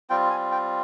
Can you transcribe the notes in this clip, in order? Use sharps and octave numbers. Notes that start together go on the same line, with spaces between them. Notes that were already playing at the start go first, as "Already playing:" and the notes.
G3 C4 F4 G5
G#5
G5